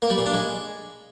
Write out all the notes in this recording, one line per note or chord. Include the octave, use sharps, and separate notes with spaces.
A#3
G3
A#2
D4
G#3